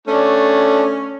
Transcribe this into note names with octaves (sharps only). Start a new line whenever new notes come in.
A3 C#4 D4